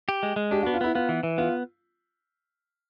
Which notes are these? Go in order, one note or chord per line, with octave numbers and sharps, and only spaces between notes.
G4
G#3
G#3
D4 G4
F#4
B3
F4
B3 E4
B3 F4
E3
E3
B3 F4